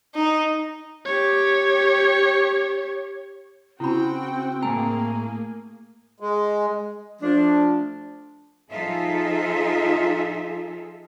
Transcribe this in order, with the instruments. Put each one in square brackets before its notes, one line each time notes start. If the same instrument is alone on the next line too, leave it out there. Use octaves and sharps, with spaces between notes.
[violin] D#4
[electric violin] G4 C#5
[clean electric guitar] C#3 [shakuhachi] C4 [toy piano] E4 B5 [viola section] F#4 G5
[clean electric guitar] A2 A3 A#5 [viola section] A#3 G#4 [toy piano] G5 G#5
[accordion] G#3
[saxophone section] F3 A3 D4
[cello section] F3 D#4 F4 G#4 A4 E5